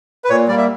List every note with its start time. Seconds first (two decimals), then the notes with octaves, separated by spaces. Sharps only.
0.24 B4
0.30 A#2 C#5
0.48 G3 A#3 D5
0.58 E5